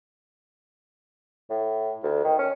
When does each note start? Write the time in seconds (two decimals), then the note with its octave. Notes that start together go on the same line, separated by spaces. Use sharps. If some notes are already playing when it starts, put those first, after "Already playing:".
1.50 A2
2.03 D2
2.24 D#3
2.39 C#4